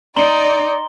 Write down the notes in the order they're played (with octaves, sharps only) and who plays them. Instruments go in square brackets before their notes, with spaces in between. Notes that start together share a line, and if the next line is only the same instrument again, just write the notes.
[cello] D#4 [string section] D5 [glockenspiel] A#5 C6 G7